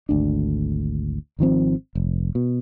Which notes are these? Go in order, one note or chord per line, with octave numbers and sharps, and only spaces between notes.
G#1 D2 D4
G#1 D#3 F3 C4
F1
B2